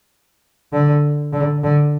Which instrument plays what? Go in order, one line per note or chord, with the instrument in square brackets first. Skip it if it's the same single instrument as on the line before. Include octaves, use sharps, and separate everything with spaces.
[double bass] D3
D3
D3